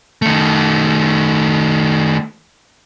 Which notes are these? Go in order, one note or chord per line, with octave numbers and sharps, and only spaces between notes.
D#3 A3